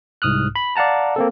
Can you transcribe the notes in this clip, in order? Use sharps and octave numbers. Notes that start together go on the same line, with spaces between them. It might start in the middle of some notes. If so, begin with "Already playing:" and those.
C2 G#2 D#6 F6 F#6
B5
D5 F5 F#5 A5 A#5
A#3 C4 A4